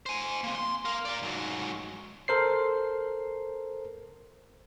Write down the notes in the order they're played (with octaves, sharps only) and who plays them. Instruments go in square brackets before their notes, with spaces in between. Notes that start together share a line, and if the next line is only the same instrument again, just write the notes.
[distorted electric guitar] C5 G#5
A#3 C4
C6
A#4 F5
A#4 D5
G#2 F#3
[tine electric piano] A4 A#4 C5 C7